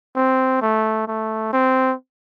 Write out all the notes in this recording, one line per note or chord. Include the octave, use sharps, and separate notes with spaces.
C4
A3
A3
C4